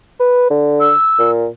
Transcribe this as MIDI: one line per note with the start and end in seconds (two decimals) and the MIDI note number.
0.20 0.47 71
0.50 0.92 50
0.80 1.31 88
1.19 1.47 46